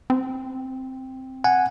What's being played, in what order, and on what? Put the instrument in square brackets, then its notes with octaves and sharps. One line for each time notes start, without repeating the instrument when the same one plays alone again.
[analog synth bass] C4
[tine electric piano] F#5 G#5